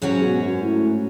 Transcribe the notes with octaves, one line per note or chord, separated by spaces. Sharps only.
G#2 C#3 F#3 C#4 F#4
B2
F#2
A2